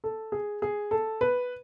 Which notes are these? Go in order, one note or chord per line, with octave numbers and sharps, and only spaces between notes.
A4
G#4
G#4
A4
B4